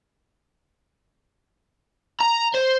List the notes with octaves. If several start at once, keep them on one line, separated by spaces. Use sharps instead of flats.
A#5
C5